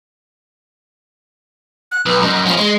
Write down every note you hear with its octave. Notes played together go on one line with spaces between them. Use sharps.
F#6
B1 B4
F#2 D#5
F3 C#4
G#3